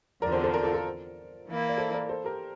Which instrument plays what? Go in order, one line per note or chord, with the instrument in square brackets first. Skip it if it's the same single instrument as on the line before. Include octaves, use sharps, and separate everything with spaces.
[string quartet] E2 D3 F3 C4 [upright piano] A#4 D5
[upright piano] A4 C5
A4 C5
A#4 D5
F4 A4
F4 A4
[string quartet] E3 A#3 E4
[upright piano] D5
A4 C5
A#4 D5
A4 C5
G4 A#4